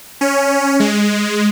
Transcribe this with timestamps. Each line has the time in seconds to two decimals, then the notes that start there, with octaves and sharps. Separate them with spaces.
0.21 C#4
0.80 G#3